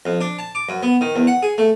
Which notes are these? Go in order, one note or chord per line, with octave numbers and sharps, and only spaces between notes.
F2
D4
A5
D6
F#2
B3
D#3
E2
F#5
G#4
A3